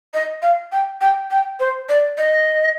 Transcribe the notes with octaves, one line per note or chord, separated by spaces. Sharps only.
D#5
F5
G5
G5
G5
C5
D5
D#5